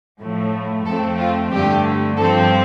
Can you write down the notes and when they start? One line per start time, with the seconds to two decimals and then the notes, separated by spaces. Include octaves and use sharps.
0.20 A2 F3 A3
0.86 F2 F3 A3 C4 A4
1.19 F4
1.52 G2 D3 A3 G4
2.17 G2 F3 C4 A4